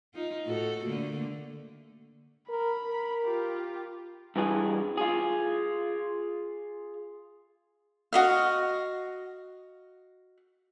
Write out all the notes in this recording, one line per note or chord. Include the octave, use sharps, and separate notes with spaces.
D#4 F4
A2 F#4 A4
D3 A3 A#3
A#4 B5
A#4
F4 G4
G2 E3 G#4
F4 G#4
F#4 D#5 F5